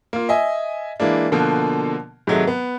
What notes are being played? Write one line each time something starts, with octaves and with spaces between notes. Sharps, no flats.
A#3 F4
D#5 E5 G#5
E3 G#3 A#3 D4
B2 D3 F3 A#3
G#2 C3 D#3 F#3 G#3 A3
B3